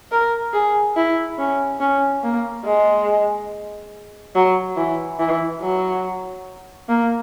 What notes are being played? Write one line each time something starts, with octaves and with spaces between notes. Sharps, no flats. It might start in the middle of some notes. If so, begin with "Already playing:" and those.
A#4
G#4
E4
C#4
C#4
A#3
G#3
F#3
E3
E3
F#3
A#3